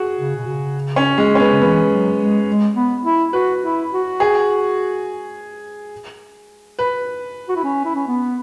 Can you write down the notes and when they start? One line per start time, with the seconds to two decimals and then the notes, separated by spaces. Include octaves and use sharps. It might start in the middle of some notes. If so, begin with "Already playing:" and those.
Already playing: F#4 G#4
0.18 C#3
0.36 B2
0.46 C#3
0.96 C#4
1.18 G#3
1.35 C#4
1.40 B3
1.53 C#3
1.61 E3 B3
1.90 F#3
2.19 G#3
2.48 G#3
2.76 B3
3.04 E4
3.33 F#4 B4
3.63 E4
3.92 F#4
4.20 G#4
6.79 B4
7.49 F#4
7.56 E4
7.64 C#4
7.85 E4
7.96 C#4
8.08 B3